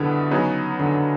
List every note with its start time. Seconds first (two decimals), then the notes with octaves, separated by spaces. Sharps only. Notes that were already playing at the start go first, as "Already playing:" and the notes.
Already playing: B2 D3 G3 B3 E4
0.31 C#3 F#3 B3 D#4 G#4
0.79 D3